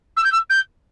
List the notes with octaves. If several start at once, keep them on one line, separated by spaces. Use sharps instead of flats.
E6
G6
E6
G6